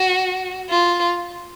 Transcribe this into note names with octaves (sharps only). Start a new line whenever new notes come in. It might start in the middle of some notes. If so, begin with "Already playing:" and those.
Already playing: F#4
F4